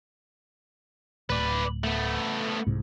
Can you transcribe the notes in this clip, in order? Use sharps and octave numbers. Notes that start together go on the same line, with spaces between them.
D1 B4 D5
A3 B3
C2 G#2